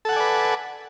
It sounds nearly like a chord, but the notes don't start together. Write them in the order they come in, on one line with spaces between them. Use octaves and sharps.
A4 F#5 G#5 D5 B4